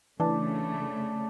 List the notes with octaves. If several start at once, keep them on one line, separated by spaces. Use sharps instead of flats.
C#3 E3 A3 D4